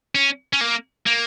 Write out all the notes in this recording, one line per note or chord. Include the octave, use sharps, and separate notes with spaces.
C#4
C#4
A#3
A#3